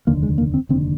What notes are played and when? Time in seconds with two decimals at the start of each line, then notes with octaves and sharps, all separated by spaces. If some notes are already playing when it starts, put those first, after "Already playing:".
0.07 F1 D#2 D3 A#3
0.23 G#3
0.38 A#3
0.54 C4
0.69 F1 D#2 D3 C4